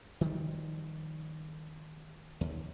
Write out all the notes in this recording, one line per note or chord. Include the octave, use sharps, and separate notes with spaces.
D#3 F3 G3
D#2